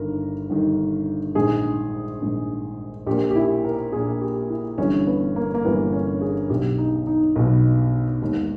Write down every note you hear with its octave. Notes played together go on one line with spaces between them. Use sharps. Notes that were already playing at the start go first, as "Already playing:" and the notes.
Already playing: G1 G2 D#3 A#4
G1 G2 D#3
A#1 G#2 D#3 G#4
A#1 G#2 D#3
A#1 A#2 G4
G4
E4
A#4
A#1 A#2 G#4
G4
E4
G1 G2 E3 C#4
B3
A#3
A#3
G1 G2 E3 B3
C#4
G#4
B1 B2 G4
D#4
D#4
B1 B2
E1 D#2 D#3